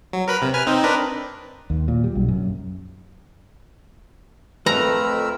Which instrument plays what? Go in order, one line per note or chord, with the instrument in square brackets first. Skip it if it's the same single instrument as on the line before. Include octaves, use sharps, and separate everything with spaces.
[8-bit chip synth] F#3
A#4 B4 B5
C3
B4 G#5 F6
C4 D#4
D4 A#4 B4
[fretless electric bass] D#2
A#2
G3
B1
F#2
[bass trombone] F2 [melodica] A3 A#4 E6 [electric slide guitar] B4 [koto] A#5